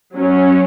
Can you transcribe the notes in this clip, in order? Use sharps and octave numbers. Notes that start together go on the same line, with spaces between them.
F#3 C#4